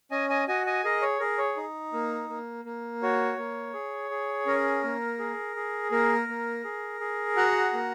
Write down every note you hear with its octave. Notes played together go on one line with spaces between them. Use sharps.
C#4 D#5 G#5
D#5 G#5
F#4 D#5 G#5
D#5 G#5
G#4 A#4 D#5
C#5
G#4 A#4
C#5
D#4
A#3
A#3
A#3
F#4 C#5
A#3
G#4
G#4
C#4 A#4
A#3
G#4
G#4
A#3 A#4
A#3
G#4
G#4
F#4 F#5 A#5
A#3